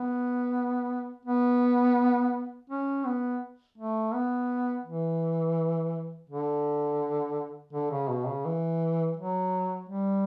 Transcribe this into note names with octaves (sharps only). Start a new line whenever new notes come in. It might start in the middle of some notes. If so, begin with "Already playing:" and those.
Already playing: B3
B3
C#4
B3
A3
B3
E3
D3
D3
C#3
B2
C#3
E3
F#3
G3